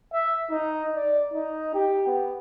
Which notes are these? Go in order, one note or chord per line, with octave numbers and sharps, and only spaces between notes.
E5
D#4
D5
D#4
G4
B3